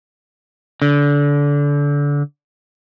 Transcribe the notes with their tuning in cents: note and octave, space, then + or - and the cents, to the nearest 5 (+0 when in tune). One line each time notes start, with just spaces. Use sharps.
D3 -25